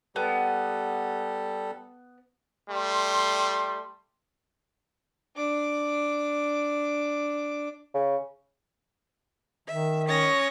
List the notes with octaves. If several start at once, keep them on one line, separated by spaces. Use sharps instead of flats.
G3 B3 G4 A4
G3 A3 C6
D4 D6
C#3
D#3 E5
C#4 C#5 C#6 D#6 A#6